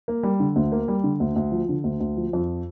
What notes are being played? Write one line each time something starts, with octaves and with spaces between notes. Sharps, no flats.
A#3
G3
D3
D2
A#3
G3
D3
D2
D2
F3
D3
D2
D2
F3
F2